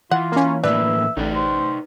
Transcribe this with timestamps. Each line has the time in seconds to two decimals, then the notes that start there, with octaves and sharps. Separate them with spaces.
0.11 E3 F4 F#5
0.32 A#3 C#4
0.64 A2 E3 A#3 D4 B4 E5
1.17 A1 D#4 B4 D5
1.35 C5